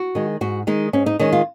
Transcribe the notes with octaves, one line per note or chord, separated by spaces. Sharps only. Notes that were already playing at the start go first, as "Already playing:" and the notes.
Already playing: F#4
D#3 G#3
G#2 F#4
D#3 G#3 D#4
G#2 C#4
D#4
D#3 G#3 C#4
F4